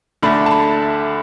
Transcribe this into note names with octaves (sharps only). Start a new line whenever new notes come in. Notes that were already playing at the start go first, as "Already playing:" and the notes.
D2 D3 A3 D4 B5
A5
B5